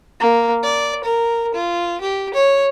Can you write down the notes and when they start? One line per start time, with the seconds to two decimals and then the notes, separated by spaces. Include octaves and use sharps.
0.20 A#3
0.63 D5
1.04 A#4
1.54 F4
2.01 G4
2.34 C#5